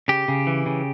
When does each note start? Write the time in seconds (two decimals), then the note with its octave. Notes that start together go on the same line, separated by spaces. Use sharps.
0.08 C#3 G4
0.28 C#3
0.47 E3
0.66 C#3